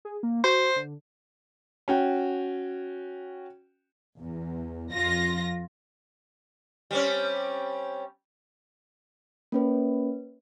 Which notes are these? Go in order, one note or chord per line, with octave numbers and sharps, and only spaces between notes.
G#4
A#3
F#4 C5
D3
C#4 F#4 G5
E2
F2 F4 A#6
G3 C4 C#4
A#3 C#4 B4